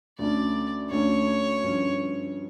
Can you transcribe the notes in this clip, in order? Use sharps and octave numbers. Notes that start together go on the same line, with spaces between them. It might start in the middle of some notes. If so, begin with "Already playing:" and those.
D2 D3 A3 C#4 D5
D2 D3 A3 C#4 C#5
G2 D3 F3 C#4